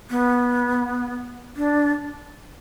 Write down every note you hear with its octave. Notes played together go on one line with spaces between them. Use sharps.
B3
D4